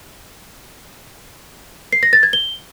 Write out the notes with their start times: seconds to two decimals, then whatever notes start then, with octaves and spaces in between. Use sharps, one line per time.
1.93 C7
2.03 A#6
2.13 A6
2.23 G#6
2.33 G7